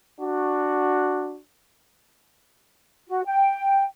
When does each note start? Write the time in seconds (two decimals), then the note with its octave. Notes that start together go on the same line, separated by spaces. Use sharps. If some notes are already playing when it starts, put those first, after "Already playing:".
0.21 D4 F#4
3.08 F#4
3.26 G5